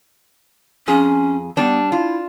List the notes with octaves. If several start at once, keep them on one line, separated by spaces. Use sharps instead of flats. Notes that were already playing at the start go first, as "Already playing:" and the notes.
F2 C#4 G#4
G3 B3 D4
E4 F4